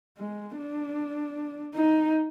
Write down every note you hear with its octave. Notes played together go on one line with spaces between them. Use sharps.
G#3
D4
D#4